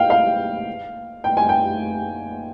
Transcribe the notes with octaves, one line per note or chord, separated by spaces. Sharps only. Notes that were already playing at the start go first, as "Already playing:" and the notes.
Already playing: F5 G5
F5
G5
G#5
G5